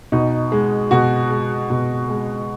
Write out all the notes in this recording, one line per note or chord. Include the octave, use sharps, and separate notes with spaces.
B2 D#4
G#3
B2 F#4
G#3
B2
G#3